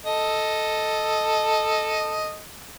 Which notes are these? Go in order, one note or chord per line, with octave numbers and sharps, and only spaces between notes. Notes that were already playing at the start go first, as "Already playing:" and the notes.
A4 D#5